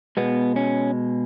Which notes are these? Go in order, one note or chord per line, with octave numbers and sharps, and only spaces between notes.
B2 G#3 B3
C#4